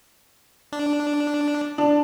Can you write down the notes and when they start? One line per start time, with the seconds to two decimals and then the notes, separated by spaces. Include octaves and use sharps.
0.72 D4
1.78 D4